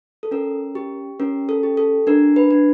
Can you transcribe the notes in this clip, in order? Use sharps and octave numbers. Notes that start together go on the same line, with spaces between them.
A4
C#4 A#4
G4
C#4 A#4
A4
G4
A4
D4 A#4
B4
D4